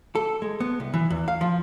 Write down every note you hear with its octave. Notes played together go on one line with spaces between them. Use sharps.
A4
G#3
B3
C2
E3
E2
F5
F3